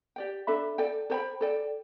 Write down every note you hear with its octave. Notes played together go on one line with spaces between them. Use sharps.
G4 D5 G5
D4 A4 E5 B5
A4 D5 G5
A4 C5 G5 B5
A4 D5 G5